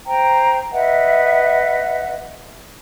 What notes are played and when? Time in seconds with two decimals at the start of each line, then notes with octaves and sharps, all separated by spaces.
0.06 C5 G5 A#5
0.73 B4 D#5 E5 F#5